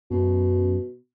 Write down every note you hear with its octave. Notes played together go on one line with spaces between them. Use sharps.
F#2 B2